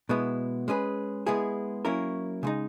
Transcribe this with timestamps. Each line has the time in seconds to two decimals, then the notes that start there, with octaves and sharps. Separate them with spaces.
0.09 B2 G#3 B3 E4
0.68 G#3 C#4 G#4 B4
1.27 G#3 B3 E4 G#4
1.85 F#3 A#3 C#4 E4 A#4
2.43 C#3 G#3 D#4